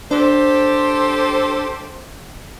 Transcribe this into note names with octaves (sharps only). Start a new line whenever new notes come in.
D4 G4 A4 C5